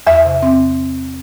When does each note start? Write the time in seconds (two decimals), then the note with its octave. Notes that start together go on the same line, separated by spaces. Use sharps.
0.07 E2 E5
0.25 C3
0.42 C4